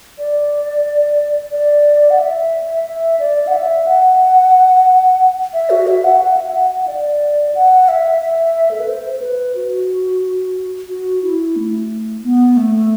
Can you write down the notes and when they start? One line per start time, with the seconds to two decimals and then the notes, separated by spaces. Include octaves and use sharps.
0.18 D5
1.52 D5
2.10 F#5
2.19 E5
2.86 E5
3.19 D5
3.47 F#5
3.53 E5
3.86 F#5
5.53 E5
5.70 F#4
5.87 E5
6.04 F#5
6.21 F#5
6.37 E5
6.55 F#5
6.71 F#5
6.87 D5
7.55 F#5
7.88 E5
8.21 E5
8.71 A4
8.80 B4
8.88 C5
9.21 B4
9.55 F#4
10.89 F#4
11.23 E4
11.56 A3
12.23 B3
12.57 A3